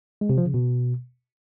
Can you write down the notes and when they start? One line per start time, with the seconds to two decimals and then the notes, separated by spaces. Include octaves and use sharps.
0.21 G#3
0.29 C3
0.38 F3
0.46 C#3
0.54 B2